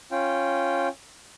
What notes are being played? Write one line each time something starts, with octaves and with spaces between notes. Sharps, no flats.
C#4 F4 G5